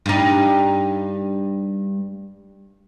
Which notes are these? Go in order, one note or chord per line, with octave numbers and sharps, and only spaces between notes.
G2 D#4